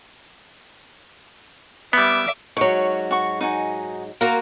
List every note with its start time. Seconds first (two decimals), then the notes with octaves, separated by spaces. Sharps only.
1.93 G3 B3 E5 D6
2.57 G#2 F#3 C#5 C#6
3.11 F#4 C#6
3.41 D#4 F#4 G#5
4.21 A#3 F4 F#4 A#4